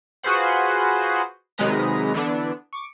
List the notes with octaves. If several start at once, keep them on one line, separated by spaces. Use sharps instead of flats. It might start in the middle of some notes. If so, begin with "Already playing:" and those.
F4 F#4 G#4 B4 C5 F#5
C3 D#3 F#3 G#3 B4 A#5
D3 E3 B3 D4
C#6 D6